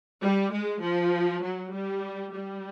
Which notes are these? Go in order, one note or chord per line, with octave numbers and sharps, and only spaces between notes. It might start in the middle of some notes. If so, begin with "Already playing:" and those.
G3
G#3
F3
F#3
G3
G3